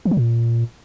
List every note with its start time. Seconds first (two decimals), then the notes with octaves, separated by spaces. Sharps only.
0.05 E3
0.11 F#3
0.17 A#2